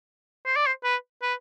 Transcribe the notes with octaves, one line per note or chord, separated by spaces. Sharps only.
C5
D5
C5
B4
B4